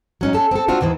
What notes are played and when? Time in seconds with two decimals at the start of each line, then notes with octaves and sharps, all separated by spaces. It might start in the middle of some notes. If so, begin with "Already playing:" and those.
0.21 F#3 C#4 D#4
0.33 C#4 A4
0.51 C4 A4
0.68 C4 D4 F4 F#4
0.81 D#2 D#3 E3 C5